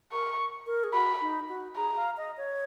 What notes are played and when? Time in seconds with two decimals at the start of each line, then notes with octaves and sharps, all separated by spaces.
0.12 A#4 C#6
0.67 A#4
0.84 G#4
0.94 F#4 B5
1.21 D#4
1.49 F#4
1.76 G#4 A#5
1.96 F5
2.17 D#5
2.37 C#5